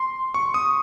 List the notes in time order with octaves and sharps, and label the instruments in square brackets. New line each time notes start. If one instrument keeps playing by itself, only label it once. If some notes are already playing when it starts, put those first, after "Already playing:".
Already playing: [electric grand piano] C6
C#6
D#6